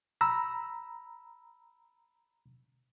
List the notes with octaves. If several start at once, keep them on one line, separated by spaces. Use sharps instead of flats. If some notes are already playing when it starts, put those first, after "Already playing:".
A#5 B5 E6